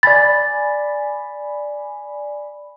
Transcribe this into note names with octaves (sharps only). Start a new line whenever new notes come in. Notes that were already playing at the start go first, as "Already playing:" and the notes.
D5 G#5 B5 A6